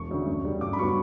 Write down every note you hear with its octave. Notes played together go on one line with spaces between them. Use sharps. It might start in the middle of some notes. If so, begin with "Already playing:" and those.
Already playing: E1 C#6
D2 C#3 F#3
F#2
C#3 G3
G2 D6
B5
F#3 B3 C#6